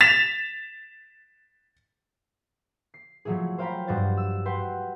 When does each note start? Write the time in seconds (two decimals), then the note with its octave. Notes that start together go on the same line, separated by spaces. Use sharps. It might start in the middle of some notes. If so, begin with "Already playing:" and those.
0.01 A6 B6 E7 F7
2.94 C7
3.25 F3 F#3 A3 E4 G#4
3.58 C5 F5 G5 A#5 B5
3.87 G2 G3 F#4 C5 A6
4.17 E6
4.45 B4 F#5 G5 C6 G6